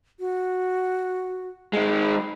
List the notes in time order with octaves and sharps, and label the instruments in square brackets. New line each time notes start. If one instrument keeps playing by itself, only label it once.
[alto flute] F#4
[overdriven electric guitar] D#3 G#3
[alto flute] B5